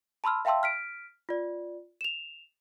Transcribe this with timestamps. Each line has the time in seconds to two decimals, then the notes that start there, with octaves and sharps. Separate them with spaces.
0.24 A5 B5 C6 E6 F6
0.45 E5 F5 G5 A5 C6 E6
0.63 F6 B6 D7
1.29 F4 D5
2.01 E7 F7